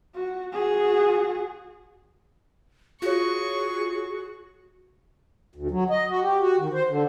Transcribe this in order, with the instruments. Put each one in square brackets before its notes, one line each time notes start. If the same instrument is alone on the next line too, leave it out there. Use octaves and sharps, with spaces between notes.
[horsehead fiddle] F#4
F#4 G#4
[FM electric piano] F4 C#5 [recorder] F#4 [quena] G#4 [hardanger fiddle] C#6
[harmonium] D2
F#3
D#5
F#4
G4
F#4
D#3
C5
D3